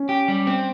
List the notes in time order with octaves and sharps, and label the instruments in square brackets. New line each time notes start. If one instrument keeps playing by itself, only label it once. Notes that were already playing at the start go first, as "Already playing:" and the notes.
Already playing: [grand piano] C#4
[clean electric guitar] G4
G3
C4